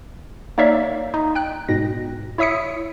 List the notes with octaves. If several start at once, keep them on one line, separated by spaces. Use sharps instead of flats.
A#3 D#4 C#5 D5 E5 F5
D#4
G5 F#6
G#2 B2 A#6
E4 C#5 E5 D#6 B6 C#7